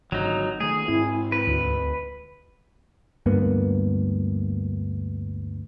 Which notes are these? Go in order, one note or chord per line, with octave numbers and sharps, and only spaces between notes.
G#1 D3 F#3 D#4
D#3 A3 G#4
G#2 C4 E4
B4
D2
D2 G2 A#3 B3